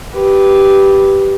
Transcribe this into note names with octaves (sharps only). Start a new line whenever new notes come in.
G4 B4